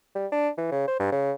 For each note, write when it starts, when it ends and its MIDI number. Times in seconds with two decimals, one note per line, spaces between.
0.15 0.27 55
0.32 0.49 62
0.58 0.71 52
0.72 0.86 49
0.87 0.99 72
1.00 1.12 43
1.12 1.32 49